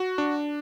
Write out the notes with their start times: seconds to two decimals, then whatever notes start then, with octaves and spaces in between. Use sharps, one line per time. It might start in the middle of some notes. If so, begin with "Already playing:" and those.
Already playing: F#4
0.18 D4